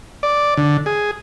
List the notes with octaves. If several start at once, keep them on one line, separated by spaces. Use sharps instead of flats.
D5
D3
G#4